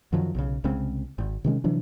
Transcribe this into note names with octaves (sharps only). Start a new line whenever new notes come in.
F#2 D#3 F3 F#3
B1 C#3
C2 C#3 G#3 C4
G#1
C3 D#3 G#3 C#4
C3 E3 F#3 D4